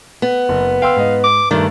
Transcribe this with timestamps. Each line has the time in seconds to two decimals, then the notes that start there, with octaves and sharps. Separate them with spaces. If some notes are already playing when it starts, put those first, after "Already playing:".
0.22 B3
0.49 F#1
0.82 F5 G5 C6 E6
0.96 G#2 D#5
1.24 D6
1.51 G2 D#3 A3 D4